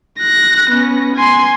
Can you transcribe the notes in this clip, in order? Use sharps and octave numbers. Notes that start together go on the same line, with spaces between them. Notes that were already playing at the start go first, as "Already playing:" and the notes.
F#6 A#6
B3 C#4
G#5 C6